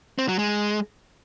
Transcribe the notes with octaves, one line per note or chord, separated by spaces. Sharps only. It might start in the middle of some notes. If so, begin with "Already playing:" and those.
C4
F#3
G#3